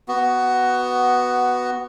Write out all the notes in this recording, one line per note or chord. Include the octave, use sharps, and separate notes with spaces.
B3 F#4